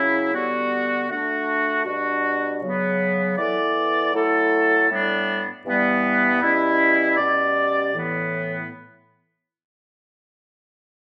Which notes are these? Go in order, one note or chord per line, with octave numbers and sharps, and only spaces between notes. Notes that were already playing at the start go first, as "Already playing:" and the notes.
Already playing: C#3 F#3 C#4 E4
D3 G3 B3 F#4
A3 D4 F#4
B2 G3 D4 F#4
C#3 F#3 B3
E3 B3 E4 A4 D5
F#3 A3 E4 A4
A2 G3 B3 D4
G2 E3 G3 B3
B2 G3 C#4 E4
B2 G3 C#4 G4 D5
A2 E3 B3